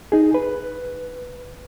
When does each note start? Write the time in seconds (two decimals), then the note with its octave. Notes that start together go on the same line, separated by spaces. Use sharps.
0.12 D#4 G#4
0.34 B4